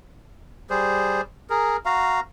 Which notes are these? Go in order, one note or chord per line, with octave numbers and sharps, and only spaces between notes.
G3 G#4 C5
G#4 A#4
F#4 F5 A#5